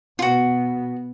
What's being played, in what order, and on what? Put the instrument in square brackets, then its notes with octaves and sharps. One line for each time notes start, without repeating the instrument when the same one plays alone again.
[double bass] B2 B3 [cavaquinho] F4 F#4